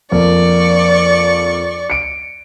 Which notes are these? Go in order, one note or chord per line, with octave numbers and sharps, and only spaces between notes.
F2 A#3 D5 C#6
C#7 D7